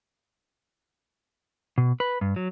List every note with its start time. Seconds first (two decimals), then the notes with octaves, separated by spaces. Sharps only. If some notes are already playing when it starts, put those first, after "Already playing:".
1.78 B2
2.00 B4
2.21 G2
2.36 F#3